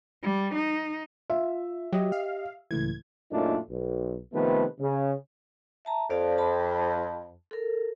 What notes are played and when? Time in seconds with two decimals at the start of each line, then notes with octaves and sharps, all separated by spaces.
0.23 G3
0.55 D#4
1.30 F4 E5
1.93 F#3 G4 D#5
2.12 F5
2.71 C#2 A2 E3 G#6
3.32 F#2 A#2 A3 D4 D#4 F4
3.70 B1
4.33 C3 D#3 F3 A3 B3 B4
4.80 C#3
5.85 E5 A5 A#5
6.10 F2 D5 F5 A5
6.38 A5 B5
7.51 A4 A#4